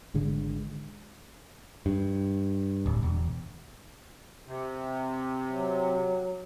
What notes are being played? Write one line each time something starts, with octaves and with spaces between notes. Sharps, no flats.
G#1 D3 G#3
G2
D1
E1
C3
F#3